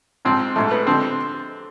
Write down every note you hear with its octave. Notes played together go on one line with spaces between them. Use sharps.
G#2 F3 C4
G#2 F3 A3
B3
D3 F3 C4